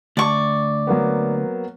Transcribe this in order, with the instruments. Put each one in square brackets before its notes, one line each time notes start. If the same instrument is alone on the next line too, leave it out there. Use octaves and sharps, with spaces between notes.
[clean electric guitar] D2 [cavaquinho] D5 C#6
[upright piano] F#3 A#3 B3